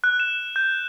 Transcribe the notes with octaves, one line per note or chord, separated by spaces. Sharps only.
F#6
E7
G6